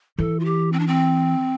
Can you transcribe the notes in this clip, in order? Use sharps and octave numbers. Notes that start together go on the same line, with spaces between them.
E3 A4
F4
G4
C4
D4
C4